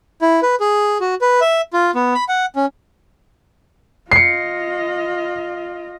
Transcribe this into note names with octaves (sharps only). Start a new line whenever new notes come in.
E4
B4
G#4
F#4
B4
E5
F4
B3
B5
F#5
C#4
F4 D#5 C7 C#7